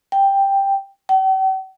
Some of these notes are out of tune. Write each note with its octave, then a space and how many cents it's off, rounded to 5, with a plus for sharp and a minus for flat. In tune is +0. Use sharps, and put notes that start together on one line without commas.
G5 +5
G5 -45